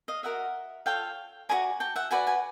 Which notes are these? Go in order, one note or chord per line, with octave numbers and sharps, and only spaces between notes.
D#5 F5
F#4 A#4 D#5 E5 F#5
F4 A4 C#5 F5 G5
F#4 B4 D5 G#5 A#5
G5 A5
E5 F#5
F#4 B4 D5 F#5 G#5
F#5 G#5